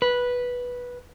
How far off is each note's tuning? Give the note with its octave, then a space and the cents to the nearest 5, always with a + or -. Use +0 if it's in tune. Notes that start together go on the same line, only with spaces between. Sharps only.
B4 -10